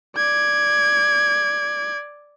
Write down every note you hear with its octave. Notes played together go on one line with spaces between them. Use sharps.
D5 G#6